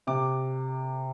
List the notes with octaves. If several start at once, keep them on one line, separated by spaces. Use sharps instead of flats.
C3 D6